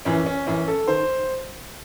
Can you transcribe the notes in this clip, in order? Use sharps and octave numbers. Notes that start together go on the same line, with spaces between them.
F#2 E3 C#4
C#4
F#2 E3 C#4
A4
D#3 C5